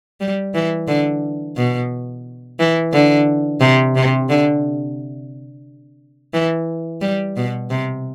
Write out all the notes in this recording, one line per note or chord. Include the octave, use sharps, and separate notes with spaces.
G3
E3
D3
B2
E3
D3
C3
C3
D3
E3
G3
B2
C3